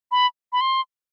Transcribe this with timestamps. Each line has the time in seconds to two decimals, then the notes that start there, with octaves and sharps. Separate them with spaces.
0.11 B5
0.53 B5
0.61 C6